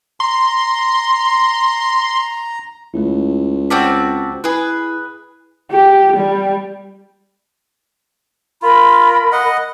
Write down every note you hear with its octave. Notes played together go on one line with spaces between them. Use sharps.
A#5 C6
C#2 A3 E4
C4 F#4 D5 A5 F6 B6
E4 G#4 B4
G4
G3
F4 A#4 B5
D#5 F#5